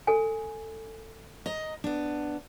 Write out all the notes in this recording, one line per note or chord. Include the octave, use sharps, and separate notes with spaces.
A4 G#5
D#5 A#5
B3 D4